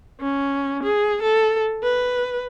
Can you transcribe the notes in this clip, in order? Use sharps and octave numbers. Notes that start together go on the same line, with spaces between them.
C#4
G#4
A4
B4